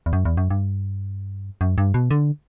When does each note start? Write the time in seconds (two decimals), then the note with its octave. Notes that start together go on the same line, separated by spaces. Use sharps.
0.06 E2
0.13 F#2
0.25 E2
0.37 F#2
0.50 G2
1.61 F#2
1.78 G2
1.94 B2
2.11 D3